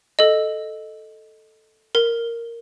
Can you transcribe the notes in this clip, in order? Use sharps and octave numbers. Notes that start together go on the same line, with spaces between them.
A4 D#5
A#4